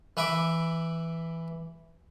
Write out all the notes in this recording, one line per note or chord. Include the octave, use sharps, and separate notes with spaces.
E3 B4 E5 B5 D6